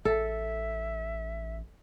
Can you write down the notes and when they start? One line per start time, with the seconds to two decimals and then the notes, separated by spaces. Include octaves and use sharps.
0.05 A1 A4 E5